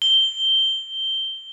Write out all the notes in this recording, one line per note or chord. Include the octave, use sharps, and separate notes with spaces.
G7